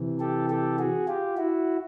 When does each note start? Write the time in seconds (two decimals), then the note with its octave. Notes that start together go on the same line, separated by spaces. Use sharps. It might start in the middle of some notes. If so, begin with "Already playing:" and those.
Already playing: C3 E3
0.20 G4 A4
0.50 G4 A4
0.79 F#4 G#4
1.08 F4 G4
1.37 E4 F#4